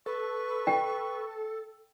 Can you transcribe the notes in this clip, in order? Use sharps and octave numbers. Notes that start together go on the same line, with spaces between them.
A4 B4 C#6
G5